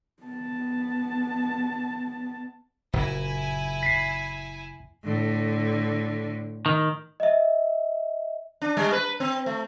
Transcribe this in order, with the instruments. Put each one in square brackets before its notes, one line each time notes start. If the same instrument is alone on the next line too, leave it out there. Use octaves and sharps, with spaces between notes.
[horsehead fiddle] B3 A5
[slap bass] F#1 A#2 [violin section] E4 G#5
[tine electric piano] B6 C7
[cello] A2 D3
[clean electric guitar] D#3
[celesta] D#5 E5
[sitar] D4
G3
B4
C4
A3